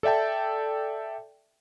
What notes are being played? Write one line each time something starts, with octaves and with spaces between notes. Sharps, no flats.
A4 D5 E5 G5 A5